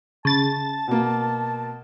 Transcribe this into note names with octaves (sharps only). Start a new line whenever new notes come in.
C#3 A5 A6
B2 A#3